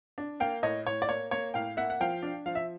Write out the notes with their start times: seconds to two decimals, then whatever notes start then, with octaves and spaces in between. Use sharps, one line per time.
0.18 D4
0.40 A#3 F5 G5
0.63 A2 C#5 D#5
0.86 A2 C#5
1.02 D5
1.09 A#3 C#5
1.31 A#3 C#5
1.54 A2 F5 G5
1.77 A#3 E5 F#5
1.90 F#5
2.00 F3 F5 G5
2.22 D4
2.46 F3 F5
2.55 E5